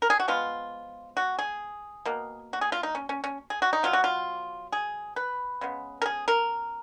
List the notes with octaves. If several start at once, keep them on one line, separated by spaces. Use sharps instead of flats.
A#4
G#4
F#4
F3 G#3 B3 F4
F#4
G#4
B2 A#3
F#4
G#4
F4
D#4
C#4
C#4
C#4
G#4
F#4
D#4
B2 F#3 B3 F4
F#4
F4
G#4
B4
C#3 G#3 B3
A#4
G#4
A#4